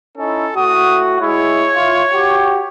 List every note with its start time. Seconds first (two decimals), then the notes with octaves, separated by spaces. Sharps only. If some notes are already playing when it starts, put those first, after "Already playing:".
0.17 C#4 D#4 E4 A4
0.56 A2 F#4 D#6
1.21 G#3 E4 C#5
1.74 E4 F4
2.14 F#4 G4